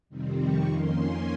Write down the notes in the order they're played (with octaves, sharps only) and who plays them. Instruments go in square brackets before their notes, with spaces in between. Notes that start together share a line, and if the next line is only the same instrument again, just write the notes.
[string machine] F2 C3 D#3 G3 C4
C#6
F2 D#3 A#3 C#4 C6
G#5